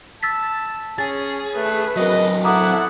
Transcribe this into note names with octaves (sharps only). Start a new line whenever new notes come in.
A5 E6 A6 B6
C#4 G#4 A6
A3 B4
F#3 C4 F#4 A#4 D#5
E4 A4 F#5 A#5 D6 D#6